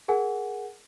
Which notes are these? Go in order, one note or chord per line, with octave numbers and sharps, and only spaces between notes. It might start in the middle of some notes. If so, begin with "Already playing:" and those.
G#4 A#4 F#5 G#5